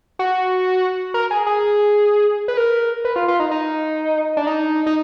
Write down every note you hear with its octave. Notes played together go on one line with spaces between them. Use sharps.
F#4
A#4
G#4
G#4
B4
A#4
B4
F4
F4
D#4
D#4
D4
D#4
D#4